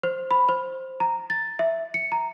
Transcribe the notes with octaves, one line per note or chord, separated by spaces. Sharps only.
C5
B5
C5
A#5
A6
E5
C#7
A#5